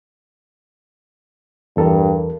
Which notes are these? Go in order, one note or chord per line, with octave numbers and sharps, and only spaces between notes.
E2 G2 A4 A#4